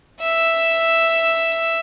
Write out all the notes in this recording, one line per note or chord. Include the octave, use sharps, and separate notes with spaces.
E5 E6